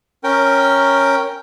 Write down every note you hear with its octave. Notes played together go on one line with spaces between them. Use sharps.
C#4 A#4 G5